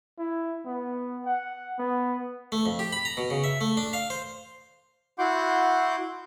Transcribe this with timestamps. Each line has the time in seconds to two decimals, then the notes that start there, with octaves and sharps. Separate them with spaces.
0.18 E4
0.66 B3
1.25 F#5
1.78 B3
2.52 A3
2.66 F2
2.79 G4
2.93 B5
3.05 A#5
3.17 B2
3.30 C#3
3.44 E5
3.61 A3
3.77 D4
3.93 F5
4.10 C5
5.18 E4 F#4 F#5 C6 D6 G6